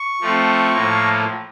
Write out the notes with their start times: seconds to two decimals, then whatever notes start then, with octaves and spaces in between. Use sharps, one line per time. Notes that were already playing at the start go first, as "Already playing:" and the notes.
Already playing: C#6
0.21 F3 A3 C4
0.73 A2 F3 A#3